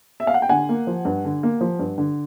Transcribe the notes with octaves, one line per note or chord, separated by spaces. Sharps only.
E5
F5
F#5
G5
D3 F#5 G#5
A#3
F3
G2
D3
A#3
F3
G2
D3